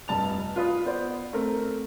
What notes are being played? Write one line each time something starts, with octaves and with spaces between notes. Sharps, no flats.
F1 G2 A5 F7
F4 B4 D#6
B3 C5 D5
A3 C4 A#4